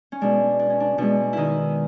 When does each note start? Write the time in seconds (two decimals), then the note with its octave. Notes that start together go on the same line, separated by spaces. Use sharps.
0.12 C#4
0.21 B2 G#3 D4
0.59 D4
0.70 C#4
0.80 D4
0.98 B2 G#3 D4
1.33 D#3 D#4 E4